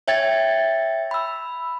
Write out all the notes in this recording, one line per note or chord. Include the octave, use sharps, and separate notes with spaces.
C#5 E5 G5 G#6 A6
B5 E6